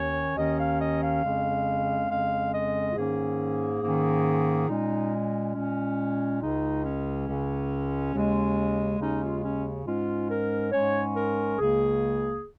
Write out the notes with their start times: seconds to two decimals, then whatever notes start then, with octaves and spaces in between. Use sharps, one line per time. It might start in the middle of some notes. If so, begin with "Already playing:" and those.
Already playing: D#2 D#3 C#4 C#5
0.37 D#2 D#3 C#4 D#5
0.58 F5
0.79 D#5
1.02 F5
1.23 F2 C#3 G#3 C#4
2.09 F2 C#3 G#3 C#4 F5
2.52 D#5
2.90 F4
2.95 G#2 D#3 A#3 C#4 G#4
3.82 G#2 D#3 A#3 C#4
4.68 A#2 G#3 C#4 D#4
5.54 A#2 G#3 C#4
6.41 C#2 C#3 G#3 D#4
6.84 C#4
7.27 C#2 C#3 G#3
8.13 D#2 C#3 G#3 C#4
8.99 D#2 C#3 G#3 C#4 D#4
9.21 F4
9.42 C#4
9.85 G#2 G#3 C#4 F4
10.29 A#4
10.71 G#2 G#3 C#4 C#5
11.15 A#4
11.58 C#2 C#3 A#3 G#4